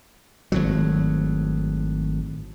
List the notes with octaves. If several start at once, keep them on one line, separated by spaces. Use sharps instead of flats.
G#1 A2 F#3